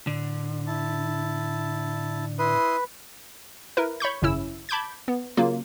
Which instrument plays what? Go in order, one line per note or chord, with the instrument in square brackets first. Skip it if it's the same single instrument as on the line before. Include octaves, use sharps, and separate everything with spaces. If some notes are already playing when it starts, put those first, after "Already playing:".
[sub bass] A2 [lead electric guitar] D3
[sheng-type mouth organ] E4 A5
[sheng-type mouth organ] E4 C6 D#6 [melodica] B4
[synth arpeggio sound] E4 A#4 B4
C#5 B5 C#6 G6
G#1 F#2 C#3 C#4 E4 E6
A5 B5 D6 G6 G#6
B3
C#3 F#3 A#3 F4